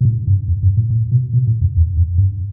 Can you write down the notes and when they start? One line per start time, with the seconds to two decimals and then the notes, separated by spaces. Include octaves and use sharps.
0.01 B2
0.05 A2
0.27 G2
0.48 F2
0.63 G2
0.77 A2
0.90 A2
1.12 B2
1.33 B2
1.47 A2
1.61 F2
1.76 E2
1.97 F2
2.18 G2